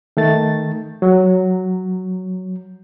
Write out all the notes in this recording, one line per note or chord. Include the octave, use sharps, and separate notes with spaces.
D#3 A3 A6
F#3